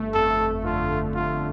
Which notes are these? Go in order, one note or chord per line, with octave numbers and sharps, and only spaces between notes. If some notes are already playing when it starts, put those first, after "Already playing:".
Already playing: G1 A3
F2 A4
G1
D3 F4
A3
G1 F4